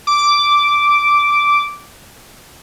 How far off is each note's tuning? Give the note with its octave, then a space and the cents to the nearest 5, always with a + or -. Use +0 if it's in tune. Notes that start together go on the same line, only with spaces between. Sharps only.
D6 -5